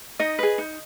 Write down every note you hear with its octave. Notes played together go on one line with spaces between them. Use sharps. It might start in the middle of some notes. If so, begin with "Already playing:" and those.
D#4 D#5
G#4 B4
D#4